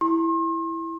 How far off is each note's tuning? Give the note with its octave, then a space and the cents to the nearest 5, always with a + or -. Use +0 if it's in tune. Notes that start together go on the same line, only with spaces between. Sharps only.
E4 +0 C6 +40